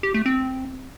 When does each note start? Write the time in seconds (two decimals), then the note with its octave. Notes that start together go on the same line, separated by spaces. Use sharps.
0.03 G4
0.14 A3
0.26 C4